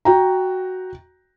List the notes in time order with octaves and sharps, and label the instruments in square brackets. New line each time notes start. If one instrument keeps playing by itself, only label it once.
[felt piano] F#4 G5 A#5